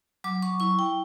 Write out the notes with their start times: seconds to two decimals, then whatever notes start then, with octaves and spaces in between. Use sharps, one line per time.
0.24 F#3 D6
0.43 C#6
0.60 E4 C#6
0.79 G5